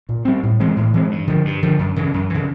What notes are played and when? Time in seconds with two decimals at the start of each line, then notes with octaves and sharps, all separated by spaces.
0.09 A#2
0.25 G3 C4
0.43 A2
0.60 E3 G#3 C4
0.76 A2
0.94 E3 G#3 C4
1.11 G2
1.27 D3 F3
1.45 G2
1.63 D3 F3
1.79 F#2
1.96 C#3 E3
2.14 F#2
2.30 C#3 E3